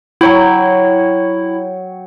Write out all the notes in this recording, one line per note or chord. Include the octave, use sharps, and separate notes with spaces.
F#3 E4 C#5 G5